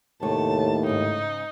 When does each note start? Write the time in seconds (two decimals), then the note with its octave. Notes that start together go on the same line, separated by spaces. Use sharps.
0.22 D#2 A2 C3 A3 C#5 A5
0.86 G#2 C#3 D#4